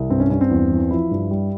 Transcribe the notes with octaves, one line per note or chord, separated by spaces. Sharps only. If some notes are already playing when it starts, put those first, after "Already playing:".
Already playing: C2
G2 C4
C#4
G2 C#4
C4
E2
E3
F3 E4
G2
G3